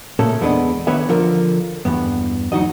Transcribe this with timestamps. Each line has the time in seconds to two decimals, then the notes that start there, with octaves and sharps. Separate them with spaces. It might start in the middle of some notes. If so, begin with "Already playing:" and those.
0.19 A#2 C#3 A3 A#3 C#4 A4
0.41 E2 G#3 B3 D4 A#4 D#5
0.87 D3 D#3 B3 B4 C#5 E5
1.09 D3 F3 F4 A#4
1.85 E2 G2 B3
2.52 D2 F#3 D#4 F#4 D#5